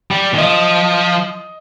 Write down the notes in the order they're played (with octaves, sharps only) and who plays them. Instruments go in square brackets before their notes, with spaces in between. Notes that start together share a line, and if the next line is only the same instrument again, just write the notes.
[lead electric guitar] G3
D#3
[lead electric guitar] F3 [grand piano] D#5